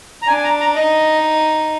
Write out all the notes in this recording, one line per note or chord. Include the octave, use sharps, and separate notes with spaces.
A#5
D4 G#5
G#5
A#5
A#5
D#4 D#5